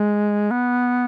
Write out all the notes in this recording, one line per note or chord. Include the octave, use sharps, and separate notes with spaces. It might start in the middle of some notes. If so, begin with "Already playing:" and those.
Already playing: G#3
B3